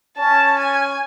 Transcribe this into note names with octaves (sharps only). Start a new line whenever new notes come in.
C#4 A5
G#5